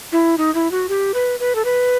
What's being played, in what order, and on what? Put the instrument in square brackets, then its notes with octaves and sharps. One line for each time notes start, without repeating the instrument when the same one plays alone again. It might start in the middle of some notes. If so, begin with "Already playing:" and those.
[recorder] E4
D#4
E4
F#4
G4
B4
B4
A4
B4